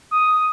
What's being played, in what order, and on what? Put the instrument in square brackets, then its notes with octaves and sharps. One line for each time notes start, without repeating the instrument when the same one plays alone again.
[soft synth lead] D#6